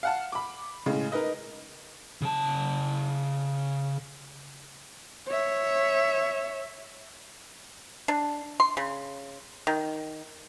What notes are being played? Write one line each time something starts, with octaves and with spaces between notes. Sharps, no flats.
F5 F#5 A5
B5 D6
A2 C#3 G#3
D#4 A#4 B4 D#5
C#3 A5
C#5 E5
D4
C6
C#3
D#3